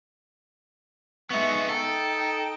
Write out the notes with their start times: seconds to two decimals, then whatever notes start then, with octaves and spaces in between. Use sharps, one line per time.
1.30 G#3 B3 D#4 E5 C#6
1.69 D#4 A4 G5